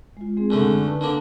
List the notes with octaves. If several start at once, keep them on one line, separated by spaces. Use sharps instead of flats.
G#3 F4
G#3 C4 G#4
F#2 D3 A3
D#4 B4 A5
D3 A#3 D4